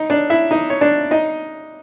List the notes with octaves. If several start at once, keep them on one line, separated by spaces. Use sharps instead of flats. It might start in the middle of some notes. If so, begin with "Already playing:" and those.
Already playing: D#4 D#5
D4 D5
E4 E5
D#4 D#5
C#5
D4 D5
D#4 D#5